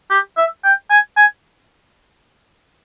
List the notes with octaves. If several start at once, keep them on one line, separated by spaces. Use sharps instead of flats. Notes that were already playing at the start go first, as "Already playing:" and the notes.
G4
E5
G5
G#5
G#5